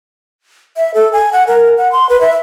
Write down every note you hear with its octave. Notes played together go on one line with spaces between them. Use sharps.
E5
A4
G#5
F#5
A#4
F#5
C6
B4
E5